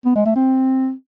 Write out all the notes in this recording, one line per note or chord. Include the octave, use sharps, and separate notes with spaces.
B3
G#3
A3
C4